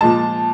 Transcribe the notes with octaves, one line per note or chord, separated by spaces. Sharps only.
A#2 F3 G#3 A5